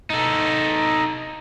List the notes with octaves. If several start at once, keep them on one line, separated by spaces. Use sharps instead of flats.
D#4 A4